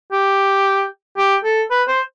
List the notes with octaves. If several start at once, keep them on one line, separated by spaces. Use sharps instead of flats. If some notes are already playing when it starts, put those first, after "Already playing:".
G4
G4
A4
B4
C5